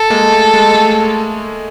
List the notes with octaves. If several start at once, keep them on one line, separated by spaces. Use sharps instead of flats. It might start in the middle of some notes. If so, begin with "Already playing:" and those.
Already playing: A4
G#3 A#3
A3
G#3
A3